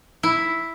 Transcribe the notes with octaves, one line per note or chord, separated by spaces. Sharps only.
E4